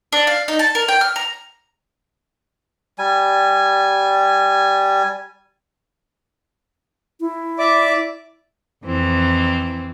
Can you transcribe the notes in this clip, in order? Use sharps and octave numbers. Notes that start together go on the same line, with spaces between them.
D4
F5
D#4
A5
A#4
G5
F6
A#5
G3 G#5
E4
D5 E5 D6
F2 E3 C4